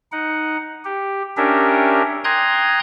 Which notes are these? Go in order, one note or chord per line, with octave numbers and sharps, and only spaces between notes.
D#4 F#5
G4
C#4 D4 G4 A#4 E5
G5 A#5 C6 D#6 F#6 G#6